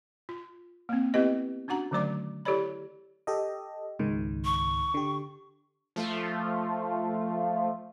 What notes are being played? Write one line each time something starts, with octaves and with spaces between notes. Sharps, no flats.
F4
A#3 C4
B3 C4 E4 G4 B4 D#5
C#4 D4 F#4 F#5 A#5
D3 D#3 F#3 A3 D5 D6
E4 G4 A4 C#5 D5 B5
G4 A4 D#5
C#2 G#2 D#3
C#6
D3 G4
F3 A3 F4